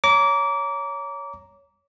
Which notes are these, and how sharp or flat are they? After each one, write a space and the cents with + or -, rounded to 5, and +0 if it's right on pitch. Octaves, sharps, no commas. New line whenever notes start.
C#5 +10 A#5 +0 D6 -25